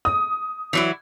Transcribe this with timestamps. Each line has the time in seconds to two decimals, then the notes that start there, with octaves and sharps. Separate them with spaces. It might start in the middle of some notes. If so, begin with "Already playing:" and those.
0.05 D#6
0.73 E3 F#3 E4